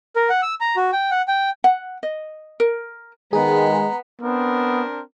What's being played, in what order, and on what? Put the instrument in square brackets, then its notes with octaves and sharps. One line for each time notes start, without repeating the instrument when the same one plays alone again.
[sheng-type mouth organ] A#4
F#5
E6
A#5
F#4
G5
F#5
G5
[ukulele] F#5
D#5
A#4
[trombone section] D#3 G#3 [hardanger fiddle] B3 [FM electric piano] G#4 [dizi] A#5
[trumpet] B3 [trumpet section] C4 D4 A#4